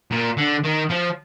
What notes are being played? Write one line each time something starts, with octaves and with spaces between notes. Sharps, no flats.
A#2
D3
D#3
F3